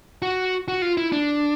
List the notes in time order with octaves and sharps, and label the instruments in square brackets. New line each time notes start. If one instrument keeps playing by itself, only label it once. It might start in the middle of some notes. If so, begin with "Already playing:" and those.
[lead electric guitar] F#4
F#4
F4
E4
D4